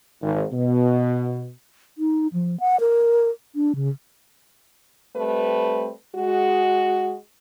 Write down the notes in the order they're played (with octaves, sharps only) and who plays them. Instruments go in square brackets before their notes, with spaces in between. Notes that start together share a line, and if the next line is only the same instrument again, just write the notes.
[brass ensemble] G#1
B2
[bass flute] D#4
F3
F#5
A#4
D4
C#3
[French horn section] G3 A3 C4 B4
G#3 F#4